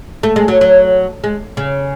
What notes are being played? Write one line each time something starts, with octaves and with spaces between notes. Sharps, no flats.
A3
G#3
F#3
F#3
G#3
C#3